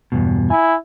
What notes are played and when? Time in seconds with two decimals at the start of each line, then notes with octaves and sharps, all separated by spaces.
0.12 E2 G2 B2
0.50 E4 G#5